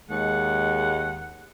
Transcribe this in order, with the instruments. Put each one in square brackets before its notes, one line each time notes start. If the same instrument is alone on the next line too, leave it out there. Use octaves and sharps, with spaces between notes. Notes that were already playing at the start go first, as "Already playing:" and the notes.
[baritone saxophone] D#2 [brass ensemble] G#3 [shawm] F#5